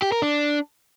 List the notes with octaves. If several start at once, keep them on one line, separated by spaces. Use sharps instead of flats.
G4
A#4
D4